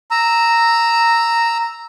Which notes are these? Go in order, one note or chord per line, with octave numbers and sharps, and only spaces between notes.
A#5 E6